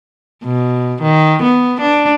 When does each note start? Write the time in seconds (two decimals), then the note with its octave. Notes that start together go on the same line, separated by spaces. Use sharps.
0.44 B2
1.02 D#3
1.43 B3
1.81 D4